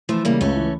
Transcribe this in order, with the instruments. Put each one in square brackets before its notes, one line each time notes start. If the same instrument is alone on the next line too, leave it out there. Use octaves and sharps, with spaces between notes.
[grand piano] E3 [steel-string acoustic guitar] F3 A3
[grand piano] C#3 [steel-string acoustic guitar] G3 A#3
[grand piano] C#2 [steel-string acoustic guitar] A3 C#4
[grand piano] E3